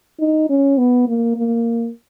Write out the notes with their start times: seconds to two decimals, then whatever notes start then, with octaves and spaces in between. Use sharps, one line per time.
0.20 D#4
0.50 C#4
0.78 B3
1.08 A#3
1.37 A#3